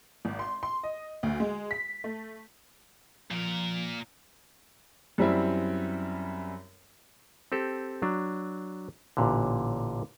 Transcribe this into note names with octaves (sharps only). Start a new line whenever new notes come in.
G#1
C6
C6
D#5
D2
G#3
B6
A3
A#2 F3 A#4
F#2 G3 C4 E4
C4 G4 A4
F#3 D4
A1 A#2 D3